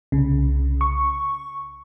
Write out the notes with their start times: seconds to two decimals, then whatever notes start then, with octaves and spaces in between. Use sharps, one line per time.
0.12 C2 C#3
0.81 C#6